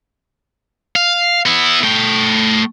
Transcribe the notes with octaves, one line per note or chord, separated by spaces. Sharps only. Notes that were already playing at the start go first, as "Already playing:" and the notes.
F5
B3 E4
A3 G5